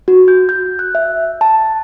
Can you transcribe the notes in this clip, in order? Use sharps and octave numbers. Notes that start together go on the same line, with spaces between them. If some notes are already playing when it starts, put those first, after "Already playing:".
F#4
G6
G6
F#6
E5
A5